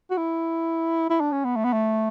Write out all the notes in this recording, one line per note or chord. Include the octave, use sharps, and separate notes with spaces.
F#4
E4
E4
D4
C#4
B3
A3
B3
A3